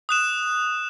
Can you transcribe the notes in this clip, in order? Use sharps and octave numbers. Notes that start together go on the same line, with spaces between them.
D#6 F#6 E7